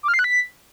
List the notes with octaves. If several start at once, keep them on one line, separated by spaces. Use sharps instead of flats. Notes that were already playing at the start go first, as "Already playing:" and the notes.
D6
F6
C7
F#6
B6